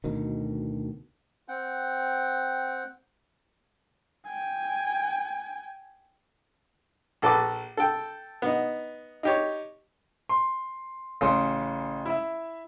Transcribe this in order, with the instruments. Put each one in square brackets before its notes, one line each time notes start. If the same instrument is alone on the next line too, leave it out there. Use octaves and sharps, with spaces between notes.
[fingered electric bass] D2 B2 D#3
[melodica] C4 F#5 G5
[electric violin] G5 G#5
[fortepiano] A#1 A4 B4 D6
A4 G5
B3 D#4
D#4 G4 C#5
[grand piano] C6
[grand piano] A1 C6 [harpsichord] C#3
[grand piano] E4 E5